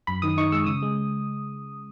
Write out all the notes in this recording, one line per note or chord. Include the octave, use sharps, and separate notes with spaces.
F#2 B5
D#3 D#6
D#4 C#6
G#3 E6
C#3 D#6
G#3